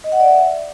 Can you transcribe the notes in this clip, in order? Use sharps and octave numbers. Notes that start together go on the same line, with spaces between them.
D#5
F#5
D5
E5